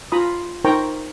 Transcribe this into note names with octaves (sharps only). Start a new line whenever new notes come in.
F4 A#5 B5 D#6
D#4 A#4 C5 G5 A#5 C#6